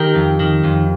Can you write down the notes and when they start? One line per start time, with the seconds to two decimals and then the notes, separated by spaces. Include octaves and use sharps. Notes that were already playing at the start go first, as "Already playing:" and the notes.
Already playing: D#3 G4 A#4
0.15 F2
0.40 D#3
0.64 F2